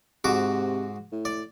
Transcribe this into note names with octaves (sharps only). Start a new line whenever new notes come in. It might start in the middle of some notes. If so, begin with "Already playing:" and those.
G#2 C3 F#4 D6
A2
D5